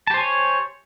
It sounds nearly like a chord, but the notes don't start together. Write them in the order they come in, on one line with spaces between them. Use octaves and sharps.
A5 G4 C5 G#5 C#5